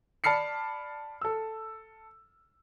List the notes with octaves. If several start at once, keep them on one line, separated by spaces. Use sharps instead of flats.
D5 A5 B5 F6 C7 C#7
A4 E6